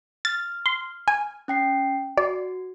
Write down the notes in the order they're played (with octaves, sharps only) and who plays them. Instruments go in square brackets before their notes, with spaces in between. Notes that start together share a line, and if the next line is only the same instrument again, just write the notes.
[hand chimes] F6 [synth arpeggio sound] A6
[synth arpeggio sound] C6
G#5
[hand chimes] C#4 G5 C7
[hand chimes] F#4 [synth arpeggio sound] D5